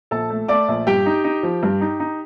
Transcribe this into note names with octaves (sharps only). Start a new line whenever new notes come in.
A#1 A4 A5
A3
A3 D5 D6
A#1
G2 G4 G5
D#4
D#4
F3
G2
D#4
D#4